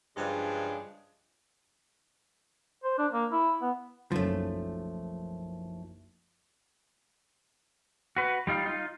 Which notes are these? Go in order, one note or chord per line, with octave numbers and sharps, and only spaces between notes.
G2 C#3 F3 G#3 D4
C5
D4
A#3
E4
B3
F#1 B1 F3 A3 C#4
F#4 B4
G3 D#4 F4
D#4 F4